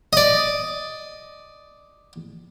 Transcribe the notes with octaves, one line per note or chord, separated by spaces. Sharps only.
D5 D#5